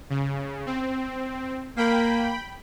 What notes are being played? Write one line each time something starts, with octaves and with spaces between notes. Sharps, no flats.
C#3
C4
A#3 G5 B5